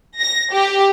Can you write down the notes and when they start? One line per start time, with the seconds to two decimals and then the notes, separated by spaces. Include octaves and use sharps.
0.20 A#6
0.53 G4